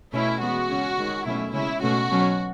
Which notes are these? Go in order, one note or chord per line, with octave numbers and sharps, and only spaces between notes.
B2 A3 C#4 E4
E3 G#3 B3 F#4
C#3 G#3 C#4
D#3 G#3 C#4
B2 F#3 A3 C#4 E4
C#3 G#3 C#4 E4
B2 A3 C#4 F#4
B2 F#3 C#4